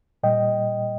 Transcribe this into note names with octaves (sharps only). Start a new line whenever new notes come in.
A#2 G3 D#5 G5